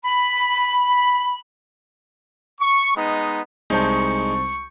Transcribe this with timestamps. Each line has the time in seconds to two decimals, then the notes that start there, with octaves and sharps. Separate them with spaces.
0.05 B5
2.60 C#6
2.95 G#3 B3 D#4
3.70 C2 G#3 D#4 C5 A5 C#6 G6